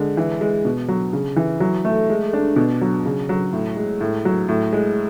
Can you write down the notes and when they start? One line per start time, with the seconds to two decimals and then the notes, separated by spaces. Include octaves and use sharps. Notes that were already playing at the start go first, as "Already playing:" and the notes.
Already playing: D3 G#3
0.17 E3
0.41 G#3
0.65 B2
0.88 F#3
1.13 C#3
1.36 E3
1.60 F#3
1.85 A3
2.09 G#3
2.33 D4
2.56 B2
2.81 F#3
3.05 C#3
3.29 F#3
3.53 A2
3.77 G#3
4.01 A2
4.25 F#3
4.48 A2
4.73 G#3